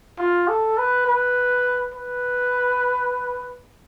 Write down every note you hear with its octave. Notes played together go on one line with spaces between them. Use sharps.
F4
A4
B4
B4
B4